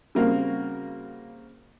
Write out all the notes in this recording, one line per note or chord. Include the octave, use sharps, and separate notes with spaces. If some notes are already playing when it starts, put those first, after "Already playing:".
C#3 G3 A#3 C4 F#4 F5